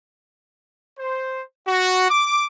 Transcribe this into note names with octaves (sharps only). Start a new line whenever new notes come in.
C5
F#4
D6